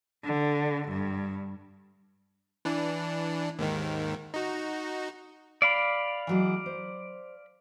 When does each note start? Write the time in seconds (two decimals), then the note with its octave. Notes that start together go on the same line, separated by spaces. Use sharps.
0.24 D3
0.89 G2
2.65 E3 D4
3.59 D#2 G#2 D#3
4.34 D#4 F#4
5.62 D5 F5 B5
6.27 E3 F#3 G#3
6.66 C5